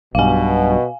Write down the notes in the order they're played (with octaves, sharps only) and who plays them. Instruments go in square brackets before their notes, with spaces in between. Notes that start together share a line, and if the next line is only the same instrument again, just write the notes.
[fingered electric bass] B1 G2 [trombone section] B2 [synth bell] F5 G#5